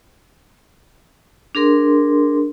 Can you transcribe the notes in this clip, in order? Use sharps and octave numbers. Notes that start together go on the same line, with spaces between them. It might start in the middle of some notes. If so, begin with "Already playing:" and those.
D4 G#4 A#4 C6